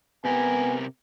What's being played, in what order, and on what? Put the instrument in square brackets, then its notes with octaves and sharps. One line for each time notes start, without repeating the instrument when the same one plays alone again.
[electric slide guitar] C3 G4 A#4 [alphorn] B3 [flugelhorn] G#5